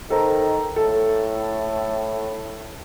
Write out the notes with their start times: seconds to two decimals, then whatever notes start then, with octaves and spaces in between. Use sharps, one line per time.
0.10 D#3 A4 C5 A#5
0.76 A2 A4